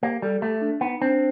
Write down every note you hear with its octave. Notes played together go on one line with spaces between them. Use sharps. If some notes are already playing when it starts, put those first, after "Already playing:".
A#3 G4
G3 A4
A3 G4
D4
B3 D#4
C4 D4